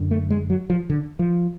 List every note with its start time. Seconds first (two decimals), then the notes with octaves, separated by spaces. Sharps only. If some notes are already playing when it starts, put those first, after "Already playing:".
Already playing: F#2 D3
0.11 A3
0.30 G#3
0.50 F#3
0.70 F3
0.90 D3
1.19 F3